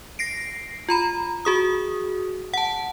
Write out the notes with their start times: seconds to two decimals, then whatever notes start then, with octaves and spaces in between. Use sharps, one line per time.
0.19 A#6 C7 D7
0.89 F4 A#5 B5
1.45 F#4 G#4 D#6
2.54 F#5 A5